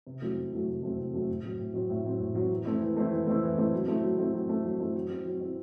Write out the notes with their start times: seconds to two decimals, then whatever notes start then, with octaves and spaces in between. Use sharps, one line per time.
0.07 C3
0.22 F#3 A3 C4 E4
0.37 C3
0.52 F#3 A3 C4 E4
0.67 C3
0.82 F#3 A3 C4 E4
0.98 C3
1.13 F#3 A3 C4 E4
1.28 A2
1.43 F#3 C4
1.59 A2
1.74 F#3 C4
1.90 A2
2.05 F#3 C4
2.20 A2
2.35 F#3 C4
2.50 E3
2.65 A3 C4 E4
2.81 E3
2.97 A3 C4 E4
3.11 E3
3.27 A3 C4 E4
3.42 E3
3.58 A3 C4 E4
3.73 F#3
3.88 A3 C4 E4
4.03 F#3
4.18 A3 C4 E4
4.33 F#3
4.49 A3 C4 E4
4.64 F#3
4.80 A3 C4 E4
4.94 F#3
5.10 C4 E4
5.25 F#3
5.41 C4 E4